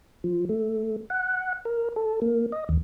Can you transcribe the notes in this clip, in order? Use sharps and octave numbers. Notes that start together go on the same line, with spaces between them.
F3
A3
F#5
A#4
A4
A#3
D#5
D#2